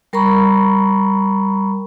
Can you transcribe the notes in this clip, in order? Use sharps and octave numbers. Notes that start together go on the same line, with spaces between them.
G3 A#4 A#5 B5 C#6